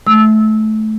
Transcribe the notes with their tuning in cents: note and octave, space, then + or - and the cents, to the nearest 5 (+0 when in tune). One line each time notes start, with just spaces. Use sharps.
A3 -20 E6 -20